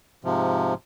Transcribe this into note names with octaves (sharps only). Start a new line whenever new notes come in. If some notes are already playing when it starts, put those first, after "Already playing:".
G#2 C3 F3